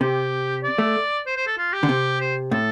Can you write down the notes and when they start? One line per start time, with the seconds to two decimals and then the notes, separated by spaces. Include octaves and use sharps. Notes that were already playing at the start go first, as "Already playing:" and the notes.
0.01 C3 G4
0.63 D5
0.78 A3
1.26 C5
1.37 C5
1.47 A4
1.58 F4
1.73 G4
1.83 D3
1.89 C3
2.21 C5
2.51 A2 A4